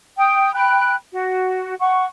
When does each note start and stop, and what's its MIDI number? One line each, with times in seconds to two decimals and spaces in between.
0.18 0.52 79
0.18 0.52 87
0.54 0.94 79
0.54 0.94 83
0.54 0.94 90
1.14 1.74 66
1.80 2.06 78
1.80 2.06 85